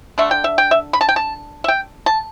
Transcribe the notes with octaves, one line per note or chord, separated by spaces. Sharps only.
D3 A3 D4 E5
G5
E5
G5
E5
B5
A5
G5
A5
E5
G5
A5